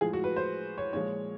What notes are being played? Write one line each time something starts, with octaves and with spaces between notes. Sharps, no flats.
A2 F3 G#3 G#4
F#4
B4
C5
C#5
A#2 F3 G#3 C#5